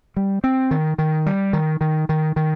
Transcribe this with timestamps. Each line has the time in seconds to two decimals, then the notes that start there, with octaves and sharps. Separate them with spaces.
0.16 G3
0.44 C4
0.71 D#3
0.98 D#3
1.26 G3
1.53 D#3
1.81 D#3
2.09 D#3
2.36 D#3